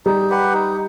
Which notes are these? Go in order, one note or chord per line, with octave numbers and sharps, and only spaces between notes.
G3 D#4
G4 B4 F#5
D#4